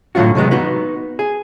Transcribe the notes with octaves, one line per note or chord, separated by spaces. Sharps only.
A2 D3 F#3 F4 F#4
C3 D#3 F#3 G#3 B3
B3 D#4 F#4
G#4